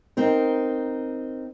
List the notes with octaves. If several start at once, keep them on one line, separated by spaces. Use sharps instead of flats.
C4 D#4 A#4